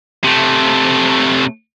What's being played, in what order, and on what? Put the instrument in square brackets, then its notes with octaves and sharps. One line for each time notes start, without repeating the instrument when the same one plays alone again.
[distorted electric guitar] C3 A3